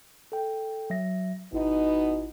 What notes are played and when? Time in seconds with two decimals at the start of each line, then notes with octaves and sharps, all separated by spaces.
0.32 A4 G5
0.90 F#3 E5 A#6
1.53 G#1 B2 B3 D#4 E4